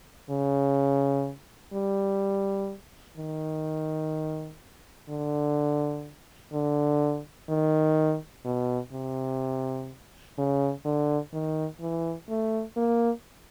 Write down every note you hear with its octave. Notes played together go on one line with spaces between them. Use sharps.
C#3
G3
D#3
D3
D3
D#3
B2
C3
C#3
D3
D#3
E3
A3
A#3